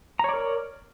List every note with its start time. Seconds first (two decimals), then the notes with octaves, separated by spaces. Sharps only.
0.19 A#5
0.24 C#5
0.29 D5
0.34 A#4